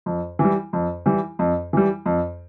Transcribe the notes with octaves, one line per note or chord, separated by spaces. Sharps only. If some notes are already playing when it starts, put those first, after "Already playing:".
F2
E3
G3
F2
E3 G3
F2
E3 G3
F2